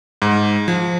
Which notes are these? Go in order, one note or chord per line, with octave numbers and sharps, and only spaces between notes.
G#2
F3